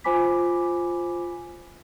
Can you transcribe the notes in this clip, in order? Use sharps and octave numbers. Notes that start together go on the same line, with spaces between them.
F4 C5 G#5 B5 D6 B6